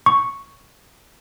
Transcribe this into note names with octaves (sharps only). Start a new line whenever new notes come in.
C#6